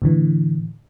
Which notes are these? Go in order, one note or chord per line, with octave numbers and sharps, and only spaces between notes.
A2 D3 E3